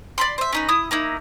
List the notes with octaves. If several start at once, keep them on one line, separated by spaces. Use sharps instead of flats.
D5 B5 C6
C5 E5
C#4 D#4 B4
E4 D#6
A#3 D#4 E4